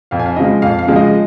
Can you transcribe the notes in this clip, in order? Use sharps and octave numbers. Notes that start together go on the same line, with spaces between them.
F2 F5
G#5
F5
C#3 F3 G#3 D#5
F2 F5
F5
C#3 F3 G#3
D#5